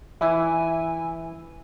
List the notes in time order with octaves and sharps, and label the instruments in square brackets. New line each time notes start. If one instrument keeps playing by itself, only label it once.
[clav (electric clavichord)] E3 [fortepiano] E4 [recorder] G#5